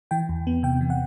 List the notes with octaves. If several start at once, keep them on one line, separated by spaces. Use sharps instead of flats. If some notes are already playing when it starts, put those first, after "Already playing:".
E3 G5
E2
B3
C3 G5
E3
F#5